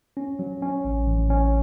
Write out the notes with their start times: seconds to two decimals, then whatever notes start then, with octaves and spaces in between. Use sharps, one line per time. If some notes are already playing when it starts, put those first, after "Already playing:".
0.17 C#4
0.39 F#3
0.62 C#4
0.85 A1
1.07 A1
1.30 C#4